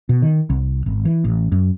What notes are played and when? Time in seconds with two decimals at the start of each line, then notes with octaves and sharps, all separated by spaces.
0.09 B2
0.22 D#3
0.50 C2
0.86 G#1
1.05 E3
1.24 A1
1.52 F#2